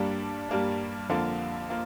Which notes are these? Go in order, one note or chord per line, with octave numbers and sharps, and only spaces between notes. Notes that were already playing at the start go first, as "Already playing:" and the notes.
Already playing: G2 G3 A#3 D4
G2 G3 A#3 D4
F2 D3 A#3 F4
A#3 F4